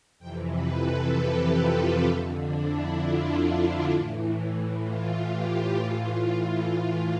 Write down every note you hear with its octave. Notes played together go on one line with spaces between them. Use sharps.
F2 C3 E3 G5
B4
A4
G4
F4
F2 D3 E4
D4
E4
F4
A2 E3
F4
G4
A2 E3 F4